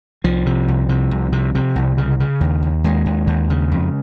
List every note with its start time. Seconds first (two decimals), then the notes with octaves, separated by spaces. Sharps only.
0.24 C2 F3
0.46 C3
0.68 C2
0.89 C3
1.11 C2
1.32 C3
1.55 C3
1.76 C2
1.98 C#3
2.20 C#3
2.41 D#2
2.62 D#2
2.84 D#2 G#3
3.06 D#2
3.27 D#2
3.50 C#3
3.71 F2